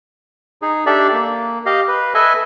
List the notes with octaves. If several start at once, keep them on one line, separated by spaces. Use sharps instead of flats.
D#4 G#4
D4 G4 A4 D5 E5
A#3
G4 D#5 F5
B4
A4 B4 D#5 E5 G#5